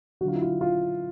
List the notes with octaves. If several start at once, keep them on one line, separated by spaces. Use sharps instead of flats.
D3 F#3 F4 F#4
E4
F4
F4